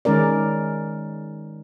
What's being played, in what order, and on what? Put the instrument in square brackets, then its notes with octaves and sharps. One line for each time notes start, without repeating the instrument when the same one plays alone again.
[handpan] D#3 G#3 C#4 A#4 D5